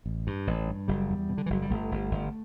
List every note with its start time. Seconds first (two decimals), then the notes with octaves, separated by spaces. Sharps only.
0.06 A1
0.27 G2
0.47 A1
0.67 G2
0.88 F#1 G3
1.09 E2
1.29 B2
1.38 D3
1.46 E3
1.50 F#1 F#3
1.62 G3
1.70 G1 A3
1.91 G1
2.11 G1